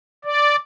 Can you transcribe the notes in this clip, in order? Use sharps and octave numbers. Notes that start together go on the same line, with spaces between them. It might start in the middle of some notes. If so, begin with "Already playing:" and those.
D5